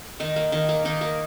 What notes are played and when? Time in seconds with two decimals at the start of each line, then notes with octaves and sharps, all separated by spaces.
0.20 D#3 D#4
0.36 A#3
0.52 D#3
0.69 A#3
0.85 D#3 D#4
1.01 A#3